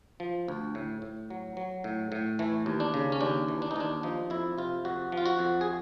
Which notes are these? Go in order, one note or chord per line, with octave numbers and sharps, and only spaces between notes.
F3
D2
A2
A2
F#3
F#3
A2
A2
E3 A3
D#2
D4
C#3
C#4
D#2 D4
E3
D4
D#4
D#2 D4
F3 D#4
F2 E4
C3 F4
F2 F#4
F3
F4
F#4
F2
G#4